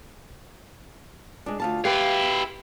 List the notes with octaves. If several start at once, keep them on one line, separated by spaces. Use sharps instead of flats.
G#3 D4
D2 F4 A5
E4 G4 B4 F5 G5